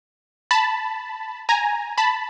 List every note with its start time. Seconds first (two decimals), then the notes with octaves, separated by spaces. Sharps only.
0.51 A5 B5
1.49 G#5 A#5
1.98 A5 B5